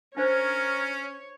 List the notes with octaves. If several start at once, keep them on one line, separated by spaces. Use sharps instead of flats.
C#4 D4 A#4 C5 C#5